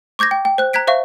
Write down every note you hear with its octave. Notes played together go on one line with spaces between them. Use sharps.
C#6 D6 G6 G#6 A#6
G5
G5
C5 F#6
A#5 F#6 G#6 B6 D7
C5 E5 F5 C#6